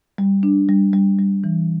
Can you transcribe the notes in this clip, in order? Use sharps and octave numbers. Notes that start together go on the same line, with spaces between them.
G3
D4
G3
G3
G3
E3